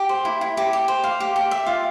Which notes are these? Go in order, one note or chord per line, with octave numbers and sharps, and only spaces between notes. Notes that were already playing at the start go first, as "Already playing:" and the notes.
Already playing: G4
C5
E4
E4
G4
G4
C5
F5
G4
G4
E5
F4